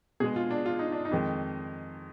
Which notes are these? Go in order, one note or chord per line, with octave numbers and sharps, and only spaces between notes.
B2 G#3 G#4
F4
D4
F4
D#4
D4
D#4
F2 D#3 G#3